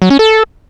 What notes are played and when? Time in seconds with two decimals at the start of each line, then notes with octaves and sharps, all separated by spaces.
0.02 F#3
0.10 C#4
0.19 A4